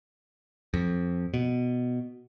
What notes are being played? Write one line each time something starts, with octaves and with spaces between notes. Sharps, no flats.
F2
B2